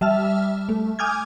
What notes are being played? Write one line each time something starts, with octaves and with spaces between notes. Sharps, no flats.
G3 E5 A5 F6
A3
G#5 D6 D#6 F6 G6 G#6